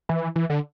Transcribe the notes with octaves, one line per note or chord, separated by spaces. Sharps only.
E3
E3
D3